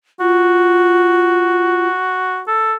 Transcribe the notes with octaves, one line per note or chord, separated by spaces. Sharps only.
F4 F#4
A4